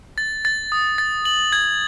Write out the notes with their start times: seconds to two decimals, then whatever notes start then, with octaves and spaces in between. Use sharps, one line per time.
0.18 A6
0.45 A6
0.72 D#6
0.98 A6
1.25 F#7
1.53 G#6